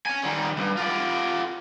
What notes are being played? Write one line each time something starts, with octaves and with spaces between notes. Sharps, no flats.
C#5 G#5
D#3 G3
C#2 G2
F4 G4